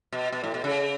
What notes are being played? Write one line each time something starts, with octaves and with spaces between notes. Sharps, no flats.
B2
B2
A2
B2
C#3